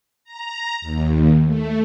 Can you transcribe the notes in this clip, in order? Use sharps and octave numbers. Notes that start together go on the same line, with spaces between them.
A#5
D#2
A3